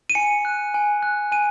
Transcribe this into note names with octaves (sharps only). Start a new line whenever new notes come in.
D#7
G#5 C#7
F#6
G#5
F#6
G#5 D#7